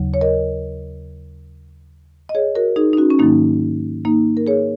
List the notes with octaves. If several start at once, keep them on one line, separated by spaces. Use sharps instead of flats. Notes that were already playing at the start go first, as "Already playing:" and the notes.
Already playing: D#2 C#3 F#3
C#5
A#4 D#5
D#5
G#4 C#5
F#4 A#4
D#4 G#4
D#4
C#4 F#4
C#4
G#2 D#3 F#3 A#3 D#4
A#3 D#4
A#4
G#4 C#5